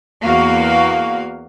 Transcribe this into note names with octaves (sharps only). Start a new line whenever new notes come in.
E2 A#3 F#4 F5